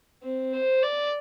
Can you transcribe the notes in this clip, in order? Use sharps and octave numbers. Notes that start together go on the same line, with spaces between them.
C4
C5
D5